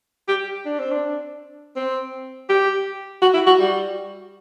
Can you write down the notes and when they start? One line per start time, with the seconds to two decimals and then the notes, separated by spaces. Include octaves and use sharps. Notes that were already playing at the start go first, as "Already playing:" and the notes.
0.28 G4
0.65 D4
0.79 C4
0.91 D4
1.76 C4
2.49 G4
3.22 F#4
3.34 E4
3.47 F#4
3.59 G3